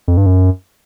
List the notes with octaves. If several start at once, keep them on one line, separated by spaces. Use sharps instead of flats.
F2
G2
F#2